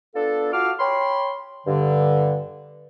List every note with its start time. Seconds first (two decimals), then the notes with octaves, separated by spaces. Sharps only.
0.15 B3 D4 F4 A4
0.53 F4 F#4 A4 F5 D6 F6
0.80 C#5 G5 B5 C6
1.66 G2 D3